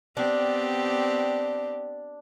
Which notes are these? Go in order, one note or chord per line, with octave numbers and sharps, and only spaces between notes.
B3 C4 D4 G4